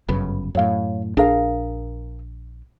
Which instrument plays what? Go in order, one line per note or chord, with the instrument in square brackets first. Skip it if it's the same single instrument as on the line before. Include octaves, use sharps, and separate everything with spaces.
[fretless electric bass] G1 F#2 C#3 [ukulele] B4
[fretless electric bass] F#2 A2 [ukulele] C#5 F5
[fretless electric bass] A#1 D4 [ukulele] G#4 A#4 F5